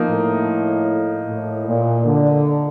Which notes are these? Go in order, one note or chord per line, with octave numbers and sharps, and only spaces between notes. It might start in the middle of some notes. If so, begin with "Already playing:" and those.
Already playing: F3 A#3 D#4
A2
A2
A#2
D3